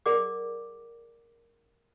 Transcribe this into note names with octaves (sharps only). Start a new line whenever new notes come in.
G#4 A#4 D5 F#5 D6